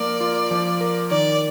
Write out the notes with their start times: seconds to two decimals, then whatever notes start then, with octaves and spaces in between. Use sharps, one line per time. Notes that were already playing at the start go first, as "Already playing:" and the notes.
Already playing: F3 A#3 A#4 D5
0.21 F4
0.51 F3
0.81 A#4
1.10 D#3 D5